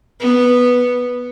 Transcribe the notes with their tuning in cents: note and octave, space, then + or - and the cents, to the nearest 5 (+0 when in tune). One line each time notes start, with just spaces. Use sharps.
B3 -5